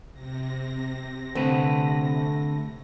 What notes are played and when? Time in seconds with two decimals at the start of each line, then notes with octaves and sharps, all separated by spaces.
0.13 C3 A#6
1.35 D3 A3 C4 B4